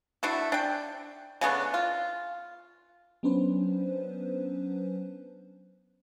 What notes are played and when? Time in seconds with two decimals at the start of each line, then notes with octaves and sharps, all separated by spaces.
0.23 A3 D4 E4 F#4
0.52 D4 G5
1.41 C#3 A3 B3 D4
1.74 F4
3.23 F#3 B3 C#4 D4 B4 C5